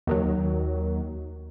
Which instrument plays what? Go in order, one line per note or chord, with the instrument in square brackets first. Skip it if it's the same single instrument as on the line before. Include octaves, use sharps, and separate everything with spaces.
[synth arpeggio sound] D#2 D#3 F#3